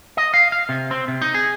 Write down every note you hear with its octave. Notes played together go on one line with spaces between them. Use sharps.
D#5
F5
F5
C3
C4
C3
D#4
G#4